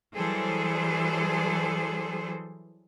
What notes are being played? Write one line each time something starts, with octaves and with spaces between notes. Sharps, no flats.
E3 F#3 G3 G#4 A4 C5